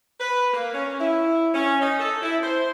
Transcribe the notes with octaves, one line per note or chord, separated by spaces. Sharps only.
B4
A#3
C#4
E4
C#4
D#4
A4
E4
C5